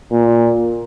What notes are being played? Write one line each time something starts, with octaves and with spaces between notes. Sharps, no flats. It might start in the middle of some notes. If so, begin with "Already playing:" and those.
A#2